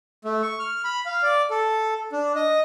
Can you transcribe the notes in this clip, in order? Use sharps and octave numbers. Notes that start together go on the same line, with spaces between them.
A3
C#6
F6
B5
F5
D5
A4
D4
D#5